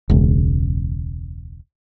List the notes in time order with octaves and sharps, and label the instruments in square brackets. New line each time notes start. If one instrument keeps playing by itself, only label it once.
[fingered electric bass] E1 C#2